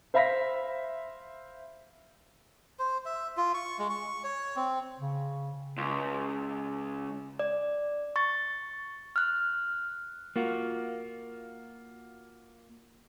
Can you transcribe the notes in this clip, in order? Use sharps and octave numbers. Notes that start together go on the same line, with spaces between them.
C5 E5 F5 B5 A#6 B6
C5
E5
F4
C#6
G#3
C#6
C#5
C4
C#3
C#2
D5
C#6 A6
F6 F#6
A#3 F4 F#4